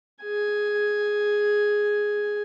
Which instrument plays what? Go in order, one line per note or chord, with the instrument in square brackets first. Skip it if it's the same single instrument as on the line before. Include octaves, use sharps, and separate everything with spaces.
[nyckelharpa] G#4 G#5